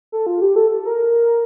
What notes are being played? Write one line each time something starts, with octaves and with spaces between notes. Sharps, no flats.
A4
F4
G4
A4
A4
A#4